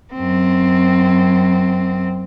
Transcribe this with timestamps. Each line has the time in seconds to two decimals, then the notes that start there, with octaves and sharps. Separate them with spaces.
0.14 F#2 C4